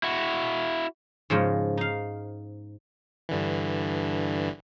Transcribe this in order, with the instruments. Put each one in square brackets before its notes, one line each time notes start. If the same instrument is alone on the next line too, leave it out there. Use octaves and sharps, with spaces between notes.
[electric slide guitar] E4 F#4
[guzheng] G#2 C#3 F3 G#3
D#4 F5
[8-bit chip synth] G2 D3 E3